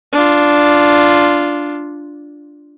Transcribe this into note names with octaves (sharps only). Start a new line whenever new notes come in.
D4 F4